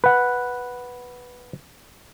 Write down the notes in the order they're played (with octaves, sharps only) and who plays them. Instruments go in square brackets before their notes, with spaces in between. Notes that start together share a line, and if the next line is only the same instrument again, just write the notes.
[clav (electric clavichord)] B4 F#5